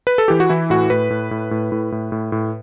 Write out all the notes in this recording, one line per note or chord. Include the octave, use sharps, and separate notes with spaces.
B4
A4
E3 G4
F#4
E3 E4
A2 F#4
A2 B4
A2
A2
A2
A2
A2
A2
A2